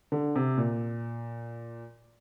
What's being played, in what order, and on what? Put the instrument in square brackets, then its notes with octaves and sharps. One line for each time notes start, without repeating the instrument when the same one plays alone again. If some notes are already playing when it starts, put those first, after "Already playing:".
[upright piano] D3
C3
A#2